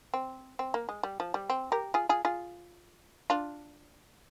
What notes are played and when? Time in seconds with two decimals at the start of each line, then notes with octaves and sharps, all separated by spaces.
0.14 C4
0.59 C4
0.74 A#3
0.89 G#3
1.03 G3
1.20 F3
1.34 G3
1.50 C4
1.72 G4 A#4
1.94 F4 G#4
2.09 F4 G#4
2.25 F4 G#4
3.30 D4 F4